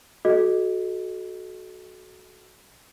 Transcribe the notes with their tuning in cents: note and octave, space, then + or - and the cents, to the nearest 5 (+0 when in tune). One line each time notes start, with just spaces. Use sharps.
F#4 +0 A4 -30 D#5 +0